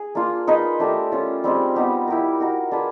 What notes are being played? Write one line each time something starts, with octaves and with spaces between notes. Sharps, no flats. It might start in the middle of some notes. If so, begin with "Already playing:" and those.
Already playing: G#4
A#3 D4 F4
D#4 G#4 B4 D#5
A3 D4 G4 A#4
C#4 F4 A4
G3 C4 D#4 G#4
B3 D#4 G4
E4 G4 A#4
D#4 F#4 A#4
D4 F4 G#4 B4